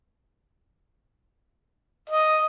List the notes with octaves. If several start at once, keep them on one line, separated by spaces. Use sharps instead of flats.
D#5